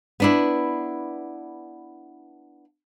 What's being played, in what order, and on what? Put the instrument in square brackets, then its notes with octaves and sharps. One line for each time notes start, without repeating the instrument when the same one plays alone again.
[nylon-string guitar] B3 D4 E4